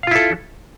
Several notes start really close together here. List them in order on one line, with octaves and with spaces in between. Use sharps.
F5 F4 E4 A4